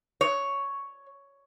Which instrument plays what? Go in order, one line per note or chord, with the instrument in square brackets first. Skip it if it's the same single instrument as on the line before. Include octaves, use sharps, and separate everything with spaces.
[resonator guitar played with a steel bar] C#5